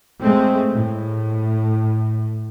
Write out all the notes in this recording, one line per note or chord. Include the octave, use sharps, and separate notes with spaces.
G#3 A3 C4
A2